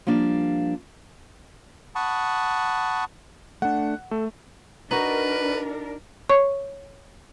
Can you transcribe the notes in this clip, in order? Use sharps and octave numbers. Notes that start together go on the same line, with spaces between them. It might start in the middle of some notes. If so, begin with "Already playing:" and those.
F3 G3 A#3 D4
F#5 A5 B5 C#6 D#6
A3 D4 F#5
A3 A4
D4 D#4 F#4 A#4 B4 D#5
C#5 C#6